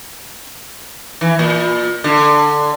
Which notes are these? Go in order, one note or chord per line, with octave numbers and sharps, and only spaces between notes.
E3
A#2
D3